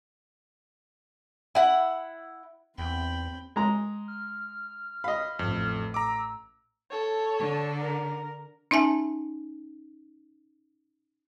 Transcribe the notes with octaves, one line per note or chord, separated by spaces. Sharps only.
E4 F#5
E2 C4 G5 B5
G#3 A#5
F6
D#5 F5 B5
A1 F2
A#5 D6 E6
A4 C#5
D3
A#4
C#4 D#4 E5 G#5 A5